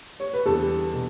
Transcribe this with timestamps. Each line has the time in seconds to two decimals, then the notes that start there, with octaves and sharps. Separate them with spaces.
0.20 C#5
0.33 B4
0.46 E2 D3 G3 A4
0.93 B2